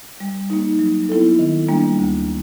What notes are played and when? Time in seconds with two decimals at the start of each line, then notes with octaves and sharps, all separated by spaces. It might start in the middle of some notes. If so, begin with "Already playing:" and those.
0.20 G3
0.50 A#3 D#4
0.79 F#3
1.09 B3 E4 A4
1.39 D#3
1.69 G3 A#3 D4
1.99 D2